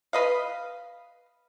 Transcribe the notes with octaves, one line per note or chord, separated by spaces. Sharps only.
B4 D#5 F5